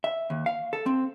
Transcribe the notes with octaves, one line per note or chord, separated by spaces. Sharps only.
E5
D#2
F5
A4
C4